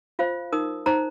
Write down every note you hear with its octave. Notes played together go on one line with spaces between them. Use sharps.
F4 C5 F5
D#4 A#4 D#6
D#4 C5 A#5